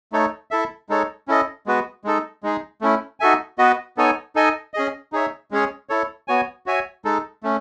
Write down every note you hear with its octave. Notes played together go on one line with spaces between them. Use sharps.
A3 D#4 A4 C#5
E4 A4 E5
G#3 D#4 A4 C#5
C#4 E4 A4 D#5
G#3 B3 F#4 B4
G#3 D#4 A4
G#3 D#4 G#4
A3 C#4 E4
D#4 F#4 A4 E5 G#5
B3 F#4 B4 D#5
B3 D#4 A4 C#5 G#5
D#4 A4 D#5 G#5
C#4 G#4 D#5
D#4 G#4 C#5 E5
G#3 C#4 G#4 C#5
E4 A4 C#5
B3 F#4 C#5 G#5
F#4 C#5 E5 G#5
G#3 D#4 A4
A3 C#4